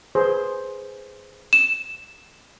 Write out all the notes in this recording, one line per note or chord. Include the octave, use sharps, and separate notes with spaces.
G#4 B4 C5
E7